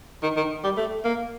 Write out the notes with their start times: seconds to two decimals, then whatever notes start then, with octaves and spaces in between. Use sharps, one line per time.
0.23 D#3
0.36 D#3
0.64 G3
0.77 A3
1.04 A#3